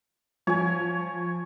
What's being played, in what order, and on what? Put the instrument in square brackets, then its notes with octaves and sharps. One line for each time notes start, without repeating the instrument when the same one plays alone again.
[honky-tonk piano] F3 [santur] C#5 G#5